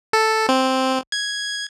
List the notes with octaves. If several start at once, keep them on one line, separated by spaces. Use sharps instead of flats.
A4
C4
G#6